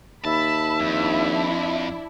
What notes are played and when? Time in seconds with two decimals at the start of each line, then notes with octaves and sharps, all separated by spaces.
0.25 D#2 E5 A5 B5
0.80 F2 D4 E4